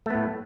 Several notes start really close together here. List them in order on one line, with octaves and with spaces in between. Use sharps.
A3 B3 A2